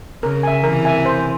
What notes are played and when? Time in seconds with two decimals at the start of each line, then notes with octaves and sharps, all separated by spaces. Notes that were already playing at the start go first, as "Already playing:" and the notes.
0.23 C#3 A#4
0.43 E5 G#5
0.64 C3 E3 A#4
0.85 E5 G#5
1.05 C5